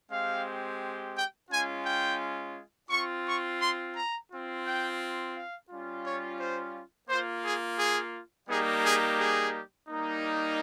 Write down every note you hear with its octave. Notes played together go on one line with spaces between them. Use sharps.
G#3 C4 G4 F5
G5
G#3 C#4 F4 G#5
G5
C4 F4 C#6
C#6
C6
A#5
C4 F4
G5
F5
G3 C#4 F4
C#5
C5
A#3 F4 C5
G#4
G#4
G3 A#3 D#4 G4 G#4
G#4
G#4
G3 A#3 D#4
A#4